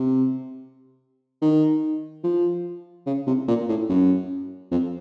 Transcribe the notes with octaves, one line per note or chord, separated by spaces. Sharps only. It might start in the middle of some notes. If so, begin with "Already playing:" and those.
Already playing: C3
D#3
F3
C#3
C3
A#2
A2
F#2
F2